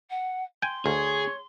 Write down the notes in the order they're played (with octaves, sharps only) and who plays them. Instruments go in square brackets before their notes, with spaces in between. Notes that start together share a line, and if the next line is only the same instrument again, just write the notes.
[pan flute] F#5
[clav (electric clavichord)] G5 G#5 [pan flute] C6
[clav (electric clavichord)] D2 [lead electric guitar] G#4 [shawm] C#5